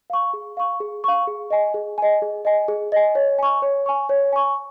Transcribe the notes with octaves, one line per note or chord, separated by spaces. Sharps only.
F5 C#6
G#4
F5 C#6
G#4
F5 C#6
G#4
D#5 G#5
G#4
D#5 G#5
G#4
D#5 G#5
G#4
D#5 G#5
C#5
G#5 C#6
C#5
G#5 C#6
C#5
G#5 C#6